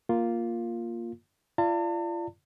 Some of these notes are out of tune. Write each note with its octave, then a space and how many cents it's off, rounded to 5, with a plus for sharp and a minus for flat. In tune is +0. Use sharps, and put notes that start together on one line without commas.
A#3 +0 F4 +0
F4 -35 D5 +0 A5 +40